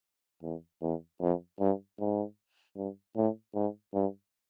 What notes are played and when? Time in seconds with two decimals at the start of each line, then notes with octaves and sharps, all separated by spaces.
0.43 E2
0.82 E2
1.21 F2
1.60 G2
1.99 G#2
2.76 G2
3.16 A2
3.55 G#2
3.94 G2